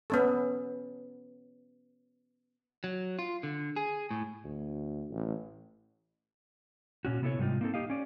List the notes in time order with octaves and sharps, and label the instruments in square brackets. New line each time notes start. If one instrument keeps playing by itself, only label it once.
[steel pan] B3 C#4 A4
[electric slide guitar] F#3
F4
D3
G#4
A2
[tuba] D2
A1
[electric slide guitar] A#2 C#4 F#4
C3 B3 E4 F#4 A4 C#5
G#2 C3 G3 D#4 F4
A#3 C4 D#4 A4
D#4 G4 D#5 F5
C#4 D5